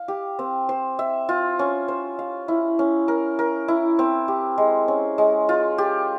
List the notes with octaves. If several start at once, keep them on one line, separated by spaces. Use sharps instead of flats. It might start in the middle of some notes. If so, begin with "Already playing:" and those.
Already playing: F5
G4
C4
C5
E5
F4
C#4
C5
F5
E4
C#4
A#4
A#4
E4
C4
G4
G#3
C#4
G#3
F4
G4